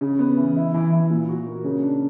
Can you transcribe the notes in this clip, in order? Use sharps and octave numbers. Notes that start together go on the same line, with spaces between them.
C#3
B3
E3
E4
E3
E3
A#2
F#4
A#3
C#3
D4